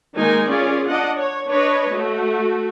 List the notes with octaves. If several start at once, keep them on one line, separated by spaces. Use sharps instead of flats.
D#3 G#3 A#3 D#4 G#5
C#4 F4 G#4 D5
D4 D#5 F#5
C#5
D4 B4 C#5 D#5
A3 F#4